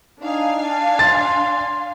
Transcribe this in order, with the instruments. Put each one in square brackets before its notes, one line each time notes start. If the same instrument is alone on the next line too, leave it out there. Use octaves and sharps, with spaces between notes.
[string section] D4 F5 G#5 [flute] D#4
[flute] A5
[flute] C6 [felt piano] A6